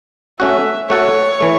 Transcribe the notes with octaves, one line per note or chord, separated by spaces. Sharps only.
A3 C#4 F#4 E5
A3 F#4 A4 C#5
E3 A3